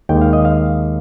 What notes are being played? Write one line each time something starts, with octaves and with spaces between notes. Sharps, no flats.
D#2 D#3 G#3 G5
F5
D#5
F5